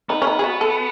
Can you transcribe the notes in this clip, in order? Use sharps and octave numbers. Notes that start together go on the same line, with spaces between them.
B3 D#4
C#4
D#4
G#4
F#4
A4